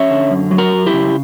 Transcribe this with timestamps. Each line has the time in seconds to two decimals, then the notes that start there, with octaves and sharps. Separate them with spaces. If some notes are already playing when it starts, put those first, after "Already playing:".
Already playing: C#4 C#5 E5
0.10 D3
0.31 F#2
0.51 F#3
0.58 F#4 A#4
0.73 F#2
0.86 E4 G4
0.93 C#3